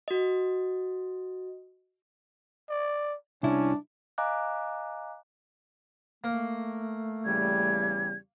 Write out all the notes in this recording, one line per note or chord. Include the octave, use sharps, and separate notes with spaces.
F#4 D#5
D5
C2 C#4 D4 E4
D#5 F5 G#5 A#5 D6 F#6
A3 A#3
E2 C#3 G3 G#6